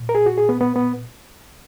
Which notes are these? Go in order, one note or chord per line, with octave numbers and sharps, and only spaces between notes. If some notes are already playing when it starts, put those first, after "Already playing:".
Already playing: A#2
A#4
G#4
F#4
G#4
B3
B3
B3